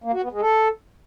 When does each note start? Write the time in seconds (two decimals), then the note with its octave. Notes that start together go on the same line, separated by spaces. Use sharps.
0.04 A#3
0.13 F#4
0.23 B3
0.32 G#3
0.41 A4